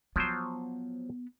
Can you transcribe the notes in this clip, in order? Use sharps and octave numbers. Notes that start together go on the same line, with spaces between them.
F3 F#3 B3 C5